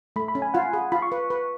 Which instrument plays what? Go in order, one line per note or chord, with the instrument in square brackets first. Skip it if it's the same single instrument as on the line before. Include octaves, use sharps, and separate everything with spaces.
[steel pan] A3 [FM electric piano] B5
[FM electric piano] B5
[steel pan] C#4
[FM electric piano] G#5
[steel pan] F4 [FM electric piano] F#5
[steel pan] G#4
[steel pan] F4 [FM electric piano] B5
[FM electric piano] C#6
[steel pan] B4
B4